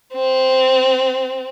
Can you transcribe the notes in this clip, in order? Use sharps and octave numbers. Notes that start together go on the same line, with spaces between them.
C4